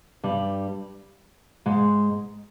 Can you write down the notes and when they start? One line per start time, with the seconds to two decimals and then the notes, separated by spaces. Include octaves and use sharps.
0.24 G2 G3
1.66 G#2 G#3